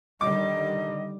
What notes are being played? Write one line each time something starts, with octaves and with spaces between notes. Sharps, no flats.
D3 D#3 G3 D#5 D6